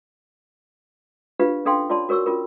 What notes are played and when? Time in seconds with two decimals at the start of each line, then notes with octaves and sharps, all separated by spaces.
1.40 D4 F4 G4 B4 F5
1.65 C#4 D4 A4 F5 G5 C6
1.89 F4 C#5 D5 A5 C6
2.09 F#4 A#4 C#5 C#6 E6
2.26 C#4 F4 A#4